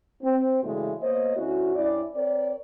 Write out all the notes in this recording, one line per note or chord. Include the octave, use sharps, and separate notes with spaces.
C4
G2 C#3 E3 G#3 A3 F#4
A#3 B3 C5 C#5 D#5
D2 C#4 E4 F#4
G2 C#4 E4 D5
C4 A#4 C#5 D5